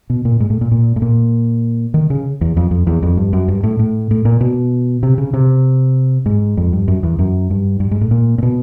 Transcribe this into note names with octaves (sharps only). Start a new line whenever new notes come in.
B2
A#2
G#2
A2
A#2
A#2
A2
A#2
D#3
C#3
E2
F2
F2
E2
F2
G2
F#2
G2
A2
A2
A2
A#2
B2
C3
C#3
C3
G#2
F2
G2
F#2
E2
F#2
G2
G2
G#2
A2
A#2
A#2
B2